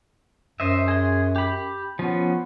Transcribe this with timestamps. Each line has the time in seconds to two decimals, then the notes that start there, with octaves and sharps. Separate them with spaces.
0.60 F#2 C5 D#5 E5
0.88 G#4 C6
1.36 G4 B5
1.99 F3 B3 C#4